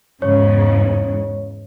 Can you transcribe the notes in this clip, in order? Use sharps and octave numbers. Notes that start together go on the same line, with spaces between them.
E2 G#2 C#3 C#5